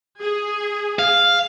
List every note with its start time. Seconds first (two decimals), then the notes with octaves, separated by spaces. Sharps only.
0.21 G#4
0.99 F5